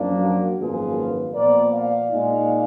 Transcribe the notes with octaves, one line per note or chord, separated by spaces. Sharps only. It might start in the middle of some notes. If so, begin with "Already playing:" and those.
Already playing: F#2 F3 A#3 D4
F#4 A#4
G#1 F#2 F3 A#3 F4 G#4 B4
A#2 F3 B3 A#4 D5
D5 F5
A#2 G#3 D#4